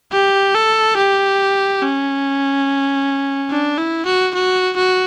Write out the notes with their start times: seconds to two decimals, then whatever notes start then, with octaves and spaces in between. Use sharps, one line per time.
0.13 G4
0.55 A4
0.97 G4
1.82 C#4
3.50 D4
3.78 E4
4.06 F#4
4.34 F#4
4.77 F#4